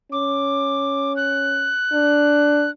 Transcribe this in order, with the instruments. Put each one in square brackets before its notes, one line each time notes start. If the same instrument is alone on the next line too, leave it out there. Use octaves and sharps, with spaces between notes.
[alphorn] C#4 [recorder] D6
[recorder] F#6
[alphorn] D4